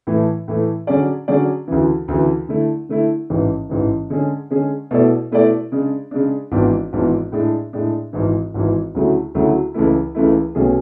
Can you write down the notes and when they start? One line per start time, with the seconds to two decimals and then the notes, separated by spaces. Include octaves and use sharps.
0.07 A2 E3 A3
0.48 A2 E3 A3
0.87 D3 F#3 C#4 G#4 D5
1.28 D3 F#3 C#4 G#4 D5
1.68 D2 C#3 E3
2.08 D2 C#3 E3
2.49 D3 A3 E4
2.89 D3 A3 E4
3.30 A1 G#2 E3
3.69 A1 G#2 E3
4.10 D3 G#3 C#4 G#4
4.50 D3 G#3 C#4 G#4
4.91 B2 A3 E4 A4 D5
5.31 B2 A3 E4 A4 D5
5.72 C#3 G#3 D4
6.11 C#3 G#3 D4
6.52 G#1 G#2 E3 B3 D4
6.93 G#1 G#2 E3 B3 D4
7.32 A2 G#3 D4
7.73 A2 G#3 D4
8.13 G#1 G#2 E3
8.54 G#1 G#2 E3
8.94 D2 C#3 F#3 A3 E4
9.35 D2 C#3 F#3 A3 E4
9.74 C#2 C#3 E3 A3 E4
10.15 C#2 C#3 E3 A3 E4
10.55 B1 B2 A3 C#4 G#4